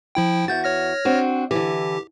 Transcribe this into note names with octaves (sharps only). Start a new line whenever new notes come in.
F3 E4 G5
E2 F#4 G6 A6
C#5 F6 A#6
C4 D4 F#4
D3 E3 G4